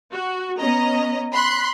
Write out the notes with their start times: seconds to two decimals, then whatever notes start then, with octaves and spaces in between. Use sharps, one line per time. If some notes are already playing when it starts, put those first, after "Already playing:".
0.11 F#4
0.57 B3 C#4 D#5 A#5
1.32 B5 C6 F#6